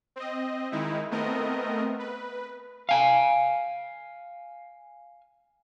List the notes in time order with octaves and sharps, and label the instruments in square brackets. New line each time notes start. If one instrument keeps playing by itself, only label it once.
[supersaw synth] C4 D#5
D#3 G#3 D#4 E4
A3 B3 C4 A#4 D#5
B4
[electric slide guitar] F5 G#5